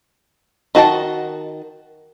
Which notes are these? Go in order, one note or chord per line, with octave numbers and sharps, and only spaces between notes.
D#3 F#4 D#5 A5